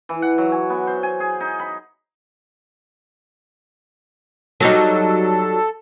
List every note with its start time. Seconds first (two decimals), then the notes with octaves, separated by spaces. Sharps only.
0.09 E3
0.22 F#5
0.38 F#3
0.52 G#5
0.70 B3
0.87 C5
1.03 G#5
1.20 G#4
1.40 D#4
1.59 B5
4.60 F#3 G3 D#4 A4